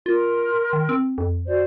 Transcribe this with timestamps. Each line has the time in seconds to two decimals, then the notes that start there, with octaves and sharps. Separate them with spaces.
0.06 F4 A#4 C6
0.73 D#3
0.89 C4
1.18 F2
1.46 F#4 C5 D5